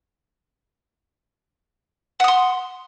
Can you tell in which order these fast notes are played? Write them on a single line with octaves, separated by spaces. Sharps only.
F#5 D#6 C6